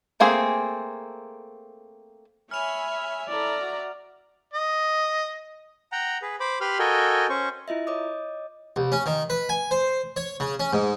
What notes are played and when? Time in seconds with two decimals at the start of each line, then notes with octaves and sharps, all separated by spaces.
0.20 A3 A#3 C4 G#4
2.51 C#5 E5 G#5 B5 F6 F7
3.29 E4 A4 D5 E5 A#5
3.60 F#4
4.54 D#5
5.92 F#5 G5 A#5
6.22 G#4 B4
6.40 C5 B5 D6
6.61 G4 B4 B5 C6 F6
6.79 F#4 A4 A#4 D#5 G5 G#5
7.29 C#4 C5 C#6
7.68 E4 F4 D#5 E5
7.87 C#5 D#5 D6 D#6
8.76 C2
8.92 C#4
9.06 D#3
9.30 B4
9.49 G#5
9.71 C5
10.16 C#5
10.40 C#3
10.60 C#4
10.73 G#2